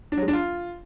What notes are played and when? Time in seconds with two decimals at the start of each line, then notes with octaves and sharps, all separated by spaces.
0.12 D4
0.17 F#3
0.23 G#3
0.28 D4
0.33 F4